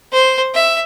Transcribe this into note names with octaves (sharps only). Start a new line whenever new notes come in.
C5
E5